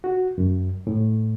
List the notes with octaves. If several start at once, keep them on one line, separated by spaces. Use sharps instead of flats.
F#4
F#2
A2